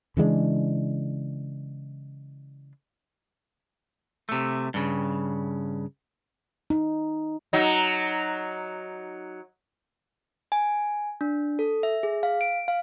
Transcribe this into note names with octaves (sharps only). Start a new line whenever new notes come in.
C#3 E3 G#3 D4
C3 A3
G2 C#3
D#4
F#3 D#4
G#5
D4
A4
E5
G#4
F5
D7
F5